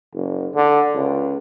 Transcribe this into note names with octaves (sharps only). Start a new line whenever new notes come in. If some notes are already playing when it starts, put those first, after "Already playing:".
F#1
D3
C#2